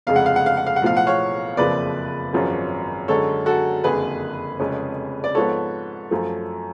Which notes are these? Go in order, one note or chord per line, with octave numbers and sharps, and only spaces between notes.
F1 F2 C#3 G#3 F5
F#5
F5
F#5
F5
F#5
F5
F#5
B1 A2 F3 F5
F#5
C#5 F5
F#1 F2 C#3 F3 B4 D5
G#1 F#2 F3 G#3 C#4
F#2 D3 G#3 C#4 A4 C#5
F#4 A4
F#1 F2 D3 G#4 B4
F1 F2 C#3 G#3 C#4
D5
G#2 F3 B3 A4 C#5
F#2 F3 A3